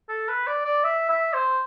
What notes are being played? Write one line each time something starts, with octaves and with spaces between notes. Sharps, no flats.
A4
B4
D5
D5
E5
E5
C5